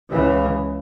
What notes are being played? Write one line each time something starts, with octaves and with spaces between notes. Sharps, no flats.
C#2 C#3 E3